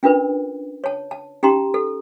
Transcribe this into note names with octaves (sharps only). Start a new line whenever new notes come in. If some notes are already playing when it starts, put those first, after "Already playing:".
C#4 D4 F4 A#4 B4
C#5 A5
A5
C#4 D#4 G4 A#5 C6
A4